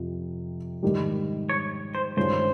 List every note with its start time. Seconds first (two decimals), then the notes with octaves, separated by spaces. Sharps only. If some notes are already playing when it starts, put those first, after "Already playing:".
Already playing: F2 C3 F3
0.83 G#2 D#3 G3
1.50 C#5
1.95 C5
2.17 G2 D#3 G#3 C#4 F4 C5